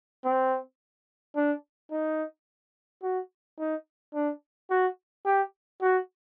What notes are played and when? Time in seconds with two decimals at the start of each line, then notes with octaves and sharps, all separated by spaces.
0.25 C4
1.36 D4
1.91 D#4
3.03 F#4
3.59 D#4
4.14 D4
4.70 F#4
5.26 G4
5.81 F#4